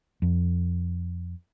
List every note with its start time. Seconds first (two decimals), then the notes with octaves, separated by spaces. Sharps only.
0.22 F2